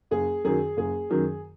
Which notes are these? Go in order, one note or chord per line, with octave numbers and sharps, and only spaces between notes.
F#1 G#4
F#2 D#3 F#3 G#4
F#1 G#4
F#2 D#3 F#3